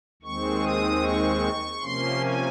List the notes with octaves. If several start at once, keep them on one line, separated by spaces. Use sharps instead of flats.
D#2 D#3 G#3 C4 C#6
D#6
C#6
C3 F3 A#3 C#4 C6
G#5